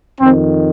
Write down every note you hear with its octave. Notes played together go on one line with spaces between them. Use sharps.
F2 D#3 C4